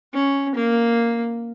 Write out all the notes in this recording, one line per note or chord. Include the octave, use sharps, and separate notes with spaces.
C#4
A#3